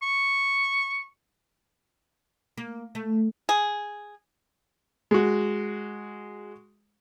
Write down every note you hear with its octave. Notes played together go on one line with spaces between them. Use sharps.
C#6
A#3
A3
G#4
G#3 F#4